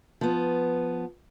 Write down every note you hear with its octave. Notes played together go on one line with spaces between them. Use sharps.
F3 B3